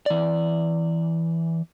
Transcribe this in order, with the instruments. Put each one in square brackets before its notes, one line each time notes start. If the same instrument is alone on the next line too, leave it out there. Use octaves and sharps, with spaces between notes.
[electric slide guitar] E3 D5